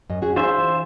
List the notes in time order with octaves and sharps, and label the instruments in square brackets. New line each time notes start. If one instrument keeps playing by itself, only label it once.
[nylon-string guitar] F#2 D#5
C#4 F#4 G#4
[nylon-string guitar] D4 E4 G#4 [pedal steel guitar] F4 C5 E5
[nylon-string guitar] E3